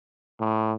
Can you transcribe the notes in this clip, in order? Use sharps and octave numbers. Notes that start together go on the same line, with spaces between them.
A2